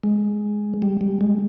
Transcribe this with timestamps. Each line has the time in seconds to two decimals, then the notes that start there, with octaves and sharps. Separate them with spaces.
0.04 G#3
0.82 G3
1.01 G3
1.21 G#3